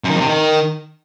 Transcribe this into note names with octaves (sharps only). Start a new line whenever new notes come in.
F#2
D#3
F2
C3
D#3